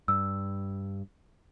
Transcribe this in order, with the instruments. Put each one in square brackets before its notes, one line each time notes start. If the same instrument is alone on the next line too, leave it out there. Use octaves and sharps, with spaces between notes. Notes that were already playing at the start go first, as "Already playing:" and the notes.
[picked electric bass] G2 [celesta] E6